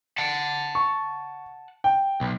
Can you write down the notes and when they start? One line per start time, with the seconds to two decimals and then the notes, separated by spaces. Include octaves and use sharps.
0.18 F#5 A5
0.75 C#6
1.84 G5
2.21 B1